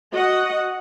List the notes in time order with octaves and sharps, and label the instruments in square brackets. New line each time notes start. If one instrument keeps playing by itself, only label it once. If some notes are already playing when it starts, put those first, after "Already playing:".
[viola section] F#4 D#5 F#5